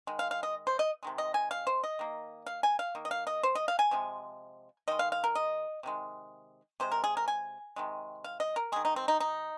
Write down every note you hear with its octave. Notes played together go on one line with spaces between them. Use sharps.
D#3 G#3
F5
F5
D#5
C5
D#5
C3 D#3 G#3
D#5
G#5
F5
C5
D#5
D#3 A#3
F5
G#5
F5
D#3 A#3
D#5
F5
D#5
C5
D#5
F5
G#5
C3 F3 G#3
D#3 G#3 D#5
F5
F5
A#4
D#5
C3 D#3 G#3
C3 G#3 C5
A#4
G#4
A#4
G#5
C3 D#3 G#3
F5
D#5
A#4
D#3 G#3 G#4
D#4
C4
D#4
D#4